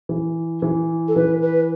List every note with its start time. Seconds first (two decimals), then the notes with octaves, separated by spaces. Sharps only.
0.09 E3
0.62 E3
1.08 A4
1.16 E3 B4
1.42 B4